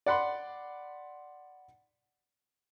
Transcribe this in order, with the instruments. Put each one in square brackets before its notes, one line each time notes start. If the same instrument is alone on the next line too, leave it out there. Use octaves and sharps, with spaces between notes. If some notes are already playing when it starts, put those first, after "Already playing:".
[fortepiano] D5 F#5 B5 C6